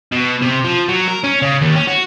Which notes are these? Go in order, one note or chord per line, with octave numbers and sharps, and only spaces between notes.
B2
C3
F3
F#3
A#4
C#4
C#3
D#2
C#4
F#4